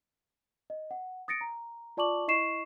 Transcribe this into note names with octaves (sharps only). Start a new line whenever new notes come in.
D#5
F#5
D#6 A6 A#6 C#7 D7
A#5
F4 D5 A5 C#6 D6 F#7
E4 D#5 C#6 C7 E7